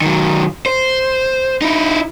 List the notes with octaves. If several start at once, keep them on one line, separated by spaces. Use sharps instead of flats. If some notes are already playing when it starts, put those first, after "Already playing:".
D#3 F#3
C5
D#4 E4